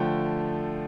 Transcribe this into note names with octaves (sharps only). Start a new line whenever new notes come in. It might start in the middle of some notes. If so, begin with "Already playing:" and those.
Already playing: D3 F3 A3 G5